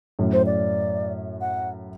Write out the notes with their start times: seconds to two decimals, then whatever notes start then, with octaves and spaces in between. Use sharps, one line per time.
0.19 F#2 A2
0.33 C5
0.46 D5
1.41 F#5